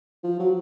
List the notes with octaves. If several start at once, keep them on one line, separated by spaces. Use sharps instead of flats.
F3
F#3